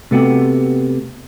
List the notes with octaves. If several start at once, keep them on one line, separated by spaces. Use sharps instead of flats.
C3 A3 B3 F#4 G4